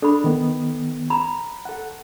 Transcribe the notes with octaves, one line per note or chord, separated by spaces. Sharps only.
D4 A4 B5
D#3 B3
A#5 B5
A4 F#5